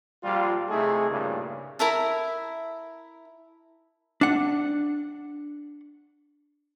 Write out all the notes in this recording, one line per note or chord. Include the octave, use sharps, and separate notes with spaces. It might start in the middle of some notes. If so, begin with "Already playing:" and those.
A#1 G3 F4
C3 A3 D#4 E4 G#4
G2 A#2 C#3
E4 A#4 E5 A5
D4 F#5